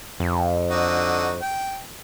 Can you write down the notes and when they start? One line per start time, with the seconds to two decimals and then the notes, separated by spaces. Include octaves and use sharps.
0.20 F2
0.70 D3 D#4 F#4
1.41 G5